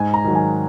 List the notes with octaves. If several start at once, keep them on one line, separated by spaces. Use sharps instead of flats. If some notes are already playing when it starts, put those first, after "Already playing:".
Already playing: G#2 G#5
A#5
D#3 F#3
G#5